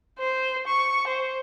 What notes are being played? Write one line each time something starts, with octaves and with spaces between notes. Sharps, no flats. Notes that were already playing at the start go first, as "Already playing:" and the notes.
C5
C#6
C5